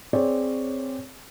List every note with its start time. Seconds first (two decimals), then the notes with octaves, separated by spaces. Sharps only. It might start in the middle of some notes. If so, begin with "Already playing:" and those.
0.13 C4 G#4 C#5 D5